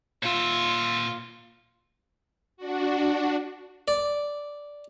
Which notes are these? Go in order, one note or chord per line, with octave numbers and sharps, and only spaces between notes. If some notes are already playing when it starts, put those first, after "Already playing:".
A#2 F4 E5
D4 F#4
D5